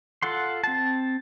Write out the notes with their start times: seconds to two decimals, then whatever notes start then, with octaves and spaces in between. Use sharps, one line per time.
0.22 F4 A4 F#5 C6
0.64 C4 A5